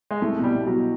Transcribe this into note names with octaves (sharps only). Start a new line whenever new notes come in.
G#3
C2 A3
B2 G3
B2
F#3